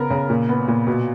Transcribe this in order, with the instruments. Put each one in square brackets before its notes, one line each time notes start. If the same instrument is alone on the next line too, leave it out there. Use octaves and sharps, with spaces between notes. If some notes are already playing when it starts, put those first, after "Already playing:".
Already playing: [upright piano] C#3 B3 A#4
C#3
A#2
B3
A#2
B2